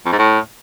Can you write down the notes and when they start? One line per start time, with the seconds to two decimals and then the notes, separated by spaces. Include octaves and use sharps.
0.06 F2
0.12 G#2
0.19 A2